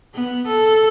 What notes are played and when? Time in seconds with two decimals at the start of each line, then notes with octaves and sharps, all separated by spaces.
0.14 B3
0.47 A4